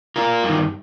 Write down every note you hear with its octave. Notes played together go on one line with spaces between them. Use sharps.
F4 A#4
G2 D#3